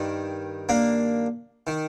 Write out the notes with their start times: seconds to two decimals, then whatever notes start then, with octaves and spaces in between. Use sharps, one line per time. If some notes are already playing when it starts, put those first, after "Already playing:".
Already playing: G2 D#3
0.69 A#3 D4
1.67 D#3